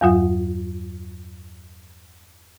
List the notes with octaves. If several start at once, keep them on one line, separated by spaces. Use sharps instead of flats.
E2 G2 F#3 F4 F#5